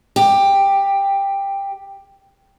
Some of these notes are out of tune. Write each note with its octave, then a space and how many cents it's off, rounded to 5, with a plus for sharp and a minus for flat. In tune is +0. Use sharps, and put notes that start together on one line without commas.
G4 +10